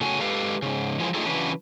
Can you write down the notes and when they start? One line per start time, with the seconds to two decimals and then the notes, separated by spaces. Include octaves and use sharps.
0.01 C#3 A3 C#4 F#4 G#5
0.21 G#3 G4 A4 B4 F5
0.62 G#2 C#3
1.00 E3 F3 G#3
1.14 A3 D4 D#4 F4 G#4 A4
1.25 C#3 E3 F#3 C#4 D4 B4